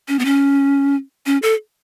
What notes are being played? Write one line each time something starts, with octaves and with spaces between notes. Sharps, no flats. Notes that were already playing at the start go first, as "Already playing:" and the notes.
C#4
B3
C#4
C#4
A4